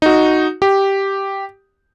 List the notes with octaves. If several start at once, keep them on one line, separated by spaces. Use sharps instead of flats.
D#4 F#4
G4